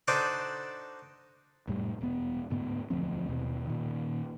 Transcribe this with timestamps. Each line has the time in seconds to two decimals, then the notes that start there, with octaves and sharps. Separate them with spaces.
0.08 D4 D#4 F#4 A4 C5 D5
1.67 F1 A2 G3
2.01 E1 B3
2.50 D2 G#2 B3
2.90 E1 D2 F3 C4
3.29 D#2 B2
3.67 A#2 D#3